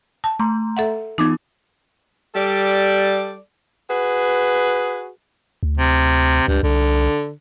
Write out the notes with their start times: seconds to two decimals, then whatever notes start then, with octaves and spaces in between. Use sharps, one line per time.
0.24 A5
0.39 A3 A#5 C6
0.77 A4 E5 F#5
1.18 E3 B3 D#4 F4 D6 G#6
2.35 G3 A4 D5
3.89 F#4 G#4 B4
5.63 D2
5.78 C3
6.48 C#2 G2
6.63 C2 D3